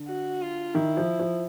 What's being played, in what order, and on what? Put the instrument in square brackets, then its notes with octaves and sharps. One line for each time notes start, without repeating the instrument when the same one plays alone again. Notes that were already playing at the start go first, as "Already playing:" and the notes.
Already playing: [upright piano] D3
[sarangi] F#4
F4
[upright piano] D#3 [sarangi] E4
[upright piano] F3
F3